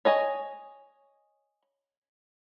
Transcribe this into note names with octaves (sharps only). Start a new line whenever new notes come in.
C#5 D#5 G#5